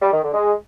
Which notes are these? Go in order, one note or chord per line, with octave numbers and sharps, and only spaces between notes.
G3
D#3
D3
G#3